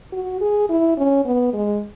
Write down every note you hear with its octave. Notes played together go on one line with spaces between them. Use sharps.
F#4
G#4
E4
C#4
B3
G#3